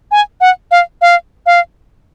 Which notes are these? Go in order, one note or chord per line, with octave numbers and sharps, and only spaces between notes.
G#5
F#5
F5
F5
F5